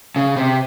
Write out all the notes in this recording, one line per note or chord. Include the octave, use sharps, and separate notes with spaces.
C#3
C3